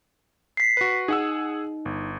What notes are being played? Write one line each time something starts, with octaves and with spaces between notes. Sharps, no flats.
B6 C7
F#4 B4
D#4 G#4 F#5 E6
G1